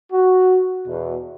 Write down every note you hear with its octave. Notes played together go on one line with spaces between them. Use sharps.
F#4
E2 B2